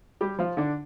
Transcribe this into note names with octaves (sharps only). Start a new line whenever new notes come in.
G3 G4
F3 F4
D3 D4